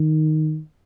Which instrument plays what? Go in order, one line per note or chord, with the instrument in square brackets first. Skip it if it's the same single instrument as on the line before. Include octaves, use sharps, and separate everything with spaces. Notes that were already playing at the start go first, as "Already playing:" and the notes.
Already playing: [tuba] D#3